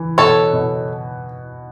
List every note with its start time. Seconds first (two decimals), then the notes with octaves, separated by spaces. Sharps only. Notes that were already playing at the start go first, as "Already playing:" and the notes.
Already playing: E3
0.18 B2 A4 C#5
0.53 B2